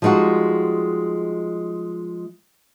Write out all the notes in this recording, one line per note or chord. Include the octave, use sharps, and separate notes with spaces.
F3 G3 G#3 D#4 F#4